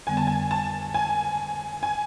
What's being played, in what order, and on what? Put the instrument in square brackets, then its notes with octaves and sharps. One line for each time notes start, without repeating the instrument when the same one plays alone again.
[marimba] F2 D3 G3 B3 [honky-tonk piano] G#5
[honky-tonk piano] A5
G#5
A5
G#5
G#5